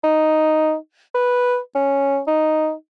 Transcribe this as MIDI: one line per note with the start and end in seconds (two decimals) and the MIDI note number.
0.04 0.75 63
1.14 1.58 71
1.75 2.20 61
2.27 2.73 63